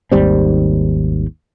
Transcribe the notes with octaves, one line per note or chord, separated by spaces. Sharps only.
G#1 D#2 G3 C4